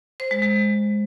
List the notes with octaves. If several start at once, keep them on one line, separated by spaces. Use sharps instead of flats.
C5
G#3
G#3